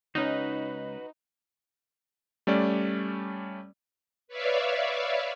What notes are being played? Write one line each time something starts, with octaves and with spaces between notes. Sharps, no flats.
C#2 C#4 D#4 F#4 B4
G3 A3 C#4 D5
B4 C#5 D5 E5 F5